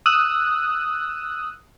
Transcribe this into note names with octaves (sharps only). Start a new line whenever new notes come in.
D#6 E6 F#6